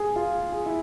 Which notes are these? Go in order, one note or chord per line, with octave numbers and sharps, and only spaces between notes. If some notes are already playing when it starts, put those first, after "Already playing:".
Already playing: G#4
F4
G#4
E4